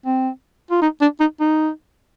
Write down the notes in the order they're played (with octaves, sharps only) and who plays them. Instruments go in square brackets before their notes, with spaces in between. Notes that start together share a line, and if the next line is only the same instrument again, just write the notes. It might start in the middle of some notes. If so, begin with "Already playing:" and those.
[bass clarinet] C4
F4
D#4
D4
D#4
D#4